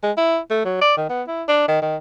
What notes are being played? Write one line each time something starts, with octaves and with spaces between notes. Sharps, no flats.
G#3
E4
A3
F#3
D5
D#3
B3
E4
D4
D#3
D#3